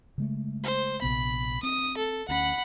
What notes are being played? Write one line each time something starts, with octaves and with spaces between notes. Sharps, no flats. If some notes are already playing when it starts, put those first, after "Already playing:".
C#3 G#3 A3
C5
A#1 C3 B3 B5
C4 D#6
A4
D2 C#4 F#5 B5